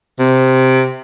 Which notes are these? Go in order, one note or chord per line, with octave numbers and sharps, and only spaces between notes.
C3